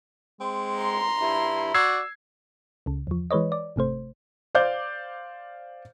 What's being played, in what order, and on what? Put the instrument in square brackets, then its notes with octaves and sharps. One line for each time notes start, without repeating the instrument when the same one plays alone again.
[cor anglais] G#3 [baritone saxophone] C4
[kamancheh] A#5 C6
[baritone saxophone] G2 [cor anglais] E4
[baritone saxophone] F#4 [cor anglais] D5 [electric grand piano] E6 G#6 C7
[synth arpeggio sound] C#2 C#3
E2 F3
E3 G#3 B4 C#5 D#5
D5
G#1 C3 A3 C5
[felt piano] C5 D5 F5 D6 G6